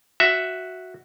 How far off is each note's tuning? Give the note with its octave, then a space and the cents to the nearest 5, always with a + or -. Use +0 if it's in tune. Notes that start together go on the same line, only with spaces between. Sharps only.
F#4 +0 E5 +0